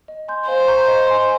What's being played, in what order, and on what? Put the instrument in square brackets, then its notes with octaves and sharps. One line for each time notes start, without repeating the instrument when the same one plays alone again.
[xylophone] D#5
G#5 C6 G6
[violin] C5 [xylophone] F5
[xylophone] A#5 C#6 G6
D#5
G#5 C6